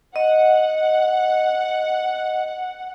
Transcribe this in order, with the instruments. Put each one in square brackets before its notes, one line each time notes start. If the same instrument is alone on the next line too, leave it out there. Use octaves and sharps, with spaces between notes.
[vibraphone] D#5 [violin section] F#5